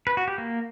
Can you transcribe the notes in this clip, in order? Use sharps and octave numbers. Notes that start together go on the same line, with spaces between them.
B4
F#4
G4
A#3